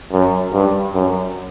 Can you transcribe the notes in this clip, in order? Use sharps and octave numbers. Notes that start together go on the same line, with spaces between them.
F#2
G2
F#2